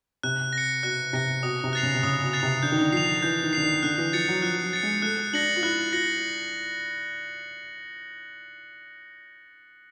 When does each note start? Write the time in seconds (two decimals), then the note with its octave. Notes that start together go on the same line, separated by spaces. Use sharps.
0.23 C3 F#6
0.53 A#6
0.58 C#7
0.83 B2 F#6
1.13 C3 A#6 C#7
1.43 B2 D#6
1.64 C3
1.73 F#6 A6 C7 F7
1.83 C#3
1.94 C3
2.03 C#3 D#6
2.23 B2
2.33 F#6 A6 C7 F7
2.43 C3
2.63 D3 G6
2.72 D#3
2.80 D3
2.92 F3 C7 F7
3.22 E3 G6
3.43 D#3
3.53 D3 C7 F7
3.63 D#3
3.83 D3 F#6
3.98 E3
4.13 F3 A6 C#7
4.28 F#3
4.42 F3 F#6
4.62 F#3
4.73 A6 C#7
4.83 G#3
5.02 A3 F#6
5.33 D4 A#6 C#7 F#7
5.56 F4
5.63 E4 F#6
5.92 F4 A#6 C#7 F#7